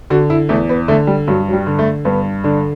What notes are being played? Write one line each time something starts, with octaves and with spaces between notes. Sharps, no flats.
D3 F#4
E4
E2 A3
B3
D3 A3
G3
G2 F#3
F#3
G3
D3
A3
G2 B3
D3 D4